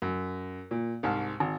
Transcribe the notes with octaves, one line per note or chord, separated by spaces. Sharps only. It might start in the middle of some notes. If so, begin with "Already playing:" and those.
F#2
A#2
C2 G#2 A5 F6
G#1